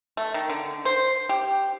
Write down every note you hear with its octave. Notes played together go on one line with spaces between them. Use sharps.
A3
D#3
D3
C5
G4